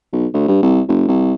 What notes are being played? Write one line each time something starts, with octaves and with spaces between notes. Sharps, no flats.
B1
D2
G2
C2
F#1
C2